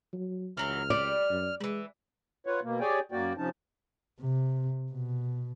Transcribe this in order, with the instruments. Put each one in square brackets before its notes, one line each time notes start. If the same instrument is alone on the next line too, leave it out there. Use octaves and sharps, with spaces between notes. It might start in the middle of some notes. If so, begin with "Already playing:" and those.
[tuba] F#3
[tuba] C#2 [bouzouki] E3 F#3 E4 [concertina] F6
[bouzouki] G3 [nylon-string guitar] D5
[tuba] F#2
[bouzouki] E3 G3 [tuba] G#3
[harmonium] F4 B4 C#5 F#5
B2 A#3
G4 G#4 C#5 D5 G5 G#5
F#2 A#3 F#4 D5 G5
C3 F3 C#4 D#4 A5
[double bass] C3
B2